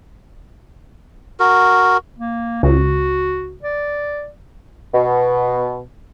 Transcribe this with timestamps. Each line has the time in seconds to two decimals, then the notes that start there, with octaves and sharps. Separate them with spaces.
1.40 F#4 A#4
2.19 A#3
2.63 C#2 F#4
3.63 D5
4.93 B2